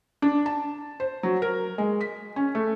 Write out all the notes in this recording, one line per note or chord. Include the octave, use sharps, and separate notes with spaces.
D4
A5
C5
F#3
A#4
G#3
B6
C#4
A3